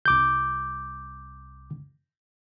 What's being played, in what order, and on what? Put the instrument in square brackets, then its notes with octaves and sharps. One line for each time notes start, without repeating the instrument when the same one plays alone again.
[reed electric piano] C2 D6 G6